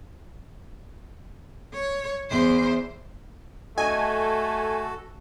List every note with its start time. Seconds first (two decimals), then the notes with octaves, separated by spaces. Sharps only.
1.73 C#5
2.31 E2 C5
3.78 A3 F#4 A4 D#5 G#5